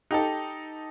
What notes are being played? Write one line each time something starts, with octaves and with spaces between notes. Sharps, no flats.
D#4 G4 A4